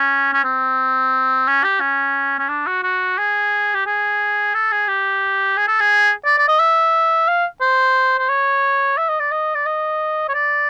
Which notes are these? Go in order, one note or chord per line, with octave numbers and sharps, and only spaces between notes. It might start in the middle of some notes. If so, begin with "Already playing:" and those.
Already playing: C#4
C#4
C4
C#4
G4
C#4
C#4
D4
F#4
F#4
G#4
G4
G#4
A4
G#4
G4
G#4
A4
G#4
D5
D5
D#5
E5
F5
C5
C5
C#5
E5
D#5
D5
D#5
D5
D#5
C#5
D5